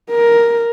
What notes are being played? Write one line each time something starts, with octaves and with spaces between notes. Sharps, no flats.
A#4